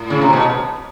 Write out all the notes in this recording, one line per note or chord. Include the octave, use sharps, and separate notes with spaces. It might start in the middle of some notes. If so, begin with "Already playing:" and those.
Already playing: A2
C#3
C3
B2